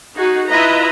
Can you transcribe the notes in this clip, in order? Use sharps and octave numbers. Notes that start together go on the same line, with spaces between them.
D#4 F#4 G#4
E4 F4 B4 D#5 A#5